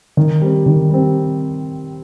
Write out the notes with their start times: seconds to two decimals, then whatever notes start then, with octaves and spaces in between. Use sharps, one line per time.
0.17 D#3
0.42 G3 C4
0.66 D#3
0.90 G3 C4